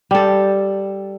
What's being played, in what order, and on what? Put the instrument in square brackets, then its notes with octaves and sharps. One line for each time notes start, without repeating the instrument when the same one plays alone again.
[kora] G3 A4